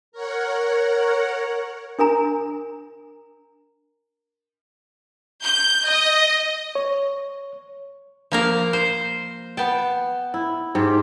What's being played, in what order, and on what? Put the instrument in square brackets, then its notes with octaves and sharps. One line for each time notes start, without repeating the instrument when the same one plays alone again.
[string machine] A#4 C#5 F#5
[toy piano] D4 A#4 G#5 A#5
[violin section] G6
D#5
[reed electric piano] C#5
[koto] F3 A#3 A#4
C5
[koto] B3 A5 [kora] G5
[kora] E4
G#2 G4